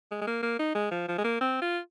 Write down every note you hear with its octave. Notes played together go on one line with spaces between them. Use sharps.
G#3
G#3
A#3
A#3
D#4
G#3
F3
F3
G#3
A#3
C4
F4